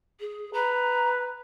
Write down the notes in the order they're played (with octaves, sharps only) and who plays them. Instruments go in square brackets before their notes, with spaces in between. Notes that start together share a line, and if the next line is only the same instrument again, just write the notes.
[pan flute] G#4
[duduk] B4 [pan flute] A#5